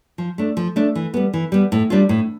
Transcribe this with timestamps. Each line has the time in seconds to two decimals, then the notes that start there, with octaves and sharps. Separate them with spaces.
0.18 F3
0.38 A3 D4
0.57 F3
0.76 A3 D4
0.95 E3
1.14 G3 B3
1.34 E3
1.52 G3 B3
1.72 A2
1.90 G3 D4 F4
2.09 A2